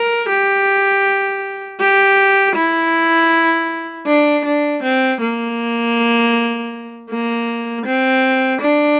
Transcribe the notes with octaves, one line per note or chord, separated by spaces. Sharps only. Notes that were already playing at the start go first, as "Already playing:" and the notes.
Already playing: A#4
G4
G4
E4
D4
D4
C4
A#3
A#3
C4
D4